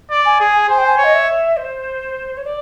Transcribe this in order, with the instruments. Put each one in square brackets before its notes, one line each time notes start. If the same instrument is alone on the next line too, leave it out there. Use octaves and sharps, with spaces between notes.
[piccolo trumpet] D5
[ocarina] G#5
[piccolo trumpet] G#4
[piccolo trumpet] C5 [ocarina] G#5
[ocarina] G5
G#5
[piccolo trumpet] C#5
[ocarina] D#5
E5
C5
C#5
D5